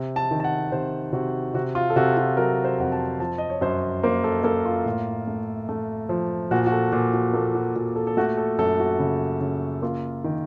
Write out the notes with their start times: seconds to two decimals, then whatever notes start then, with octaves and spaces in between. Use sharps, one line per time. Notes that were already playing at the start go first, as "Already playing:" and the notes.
Already playing: C3
0.16 A5
0.31 D#3
0.40 A5
0.44 F#5
0.72 C3 C5
1.13 C3 F#4
1.54 C3 F#4
1.75 F4
1.90 A4
1.96 C3 F#4
2.17 F#4
2.37 F#3 A#4
2.64 C5
2.79 F2 F#5
2.92 A5
3.20 F3 A5
3.38 D#5
3.50 C#5
3.61 F#2 C5
4.03 A#3 C5
4.24 A4
4.44 A#3 A4
4.66 F4
4.85 A2
5.27 A3
5.69 A3
6.09 F3
6.51 A#2 F#4
6.66 F#4
6.72 A4
6.92 A#2
7.13 F#4
7.33 A#3 A4
7.55 F#4
7.76 A#2 F#4
7.96 A4
8.07 A4
8.17 A3 F#4
8.37 A4
8.58 F#2 A4
8.79 F#4
8.99 C#3
9.41 C#3
9.82 A#3 F4
10.24 D#3